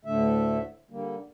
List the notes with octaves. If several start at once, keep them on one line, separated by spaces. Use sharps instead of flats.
D2 A2 D3 A3 E5
D3 G3 A#3